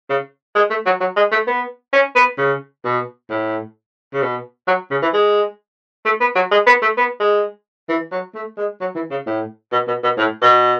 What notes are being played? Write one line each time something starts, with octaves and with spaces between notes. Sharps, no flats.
C#3
G#3
A3
F#3
F#3
G#3
A3
B3
C#4
B3
C#3
B2
A2
C#3
B2
F#3
C#3
E3
G#3
A3
B3
F#3
G#3
B3
A3
B3
G#3
E3
F#3
A3
G#3
F#3
E3
C#3
A2
B2
B2
B2
A2
B2